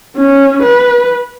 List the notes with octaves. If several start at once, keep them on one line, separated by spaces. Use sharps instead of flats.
C#4
B4